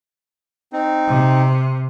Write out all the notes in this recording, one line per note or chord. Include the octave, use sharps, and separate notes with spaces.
C4 D#4
C3